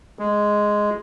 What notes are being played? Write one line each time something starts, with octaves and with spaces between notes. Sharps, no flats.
G#3